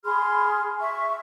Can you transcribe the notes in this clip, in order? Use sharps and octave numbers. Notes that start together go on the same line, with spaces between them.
G#4 B5 C6 F6
E5 C#6